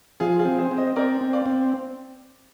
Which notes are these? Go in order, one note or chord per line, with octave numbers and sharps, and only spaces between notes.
F3 F4 G#4
F4 G#4
C4
G#4 C5
C4
C5 D#5
D#5
C4 A#4 D5
C4
D5 F5
C4